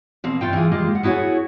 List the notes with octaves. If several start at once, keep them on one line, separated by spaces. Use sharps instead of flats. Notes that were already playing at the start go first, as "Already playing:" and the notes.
B2 A#3 C4
G2 A3 F4 G5
E3 G#3 F4 G#4
G3 G#3 A#3 F4 G4
D#2 F#5
B3 E4 F#4 G#4 C#5